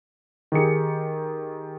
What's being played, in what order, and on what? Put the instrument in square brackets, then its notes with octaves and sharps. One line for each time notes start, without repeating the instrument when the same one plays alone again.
[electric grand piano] D#3 G4 G#4 C#7